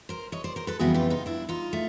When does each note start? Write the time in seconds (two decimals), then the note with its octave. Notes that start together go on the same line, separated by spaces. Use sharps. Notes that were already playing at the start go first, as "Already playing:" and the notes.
0.09 A#4 C5
0.32 C#5 D#5
0.44 C5 D5
0.56 A#4 C5
0.67 A4 B4
0.79 F2 C#3 E3 G3 B3 F#4 G#4
0.94 F4 G4
1.10 D#4 F4
1.26 D4 E4
1.49 D#4 F4
1.73 A3